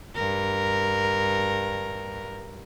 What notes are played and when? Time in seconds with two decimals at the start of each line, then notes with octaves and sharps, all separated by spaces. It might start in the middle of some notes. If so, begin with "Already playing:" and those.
0.15 G2 A#4